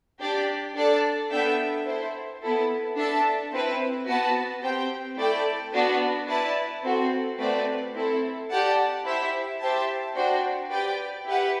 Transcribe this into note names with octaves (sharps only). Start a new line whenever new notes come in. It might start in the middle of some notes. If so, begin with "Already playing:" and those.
D4 G4 D5
D4 A4 D5 A5
B3 D4 A4 E5 G5
E4 A4 C5
B3 E4 A4
D4 A4 E5 A5
C4 E4 B4
B3 F#4 B4 F#5 A5
C4 G4 C5 G5
A3 E4 A4 D5 G5
B3 D4 F#4 B4
E4 B4 D5 A5
C4 F#4 A4
A3 C4 F#4 B4 D5
C4 E4 A4
G4 D5 F#5 A5
E4 G4 C5 E5
G4 C5 E5 A5
D4 F#4 C5 G5
G4 B4 D5 G5
E4 G4 B4 F#5